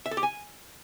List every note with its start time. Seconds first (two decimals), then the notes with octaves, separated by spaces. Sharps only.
0.06 E5
0.11 A4
0.17 G4
0.23 G#5